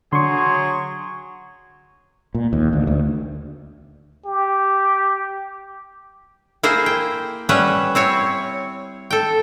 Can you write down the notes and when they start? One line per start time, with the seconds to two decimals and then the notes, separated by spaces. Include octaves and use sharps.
0.12 D3 F#3 G#4 C6 C#6
2.34 A#2
2.53 D#2
2.73 D2
2.87 D2
4.25 G4
6.63 A#3 E4 G#4 C5
6.86 G5
7.49 G3 C#4 B4 E5 F#5
7.95 C4 E4 C#5
9.11 A4 G5